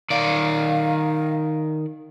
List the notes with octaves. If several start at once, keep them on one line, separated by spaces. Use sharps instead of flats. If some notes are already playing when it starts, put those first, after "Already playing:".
D#3 D5 F5